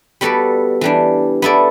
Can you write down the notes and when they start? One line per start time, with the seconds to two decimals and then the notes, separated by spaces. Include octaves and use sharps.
0.21 G3 B3 F#4 A4 D5
0.81 E3 G3 D4
1.42 B3 E4 A4 D5